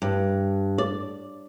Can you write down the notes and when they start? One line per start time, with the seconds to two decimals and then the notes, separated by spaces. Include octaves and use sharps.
0.02 G2
0.78 D5